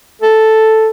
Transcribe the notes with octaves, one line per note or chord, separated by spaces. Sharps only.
A4